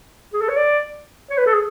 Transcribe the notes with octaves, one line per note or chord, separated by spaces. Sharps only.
G#4
A4
C#5
D5
C#5
B4
A4
G#4